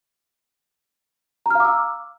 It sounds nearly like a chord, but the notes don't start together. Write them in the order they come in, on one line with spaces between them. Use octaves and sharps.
A#5 F6 F5 D6 E6